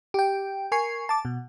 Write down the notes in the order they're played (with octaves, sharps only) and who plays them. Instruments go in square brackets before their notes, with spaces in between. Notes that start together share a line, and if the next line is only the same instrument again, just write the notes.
[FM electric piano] G4 G5
A#4 G#5 C#6 C7
A5 D6
B2